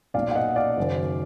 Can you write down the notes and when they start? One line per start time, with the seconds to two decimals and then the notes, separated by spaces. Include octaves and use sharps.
0.14 B1 A#2 D5 F5
0.31 F5
0.35 D#5 F#5
0.56 D5 F5
0.77 F#1 F#2 D#3